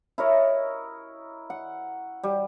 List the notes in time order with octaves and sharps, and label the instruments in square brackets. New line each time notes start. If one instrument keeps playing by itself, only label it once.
[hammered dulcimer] E4 A#4 C#5 D#5
F#5
G3